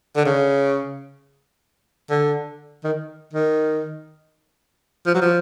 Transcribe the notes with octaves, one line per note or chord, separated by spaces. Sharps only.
D3
C#3
D3
D#3
D#3
F3
F#3
F3